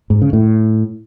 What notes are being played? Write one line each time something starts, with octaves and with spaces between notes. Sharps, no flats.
G#2
C#3
A2